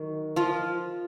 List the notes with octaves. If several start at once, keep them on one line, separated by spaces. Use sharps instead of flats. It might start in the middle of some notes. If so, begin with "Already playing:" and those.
Already playing: D#3 F#3
F3 F4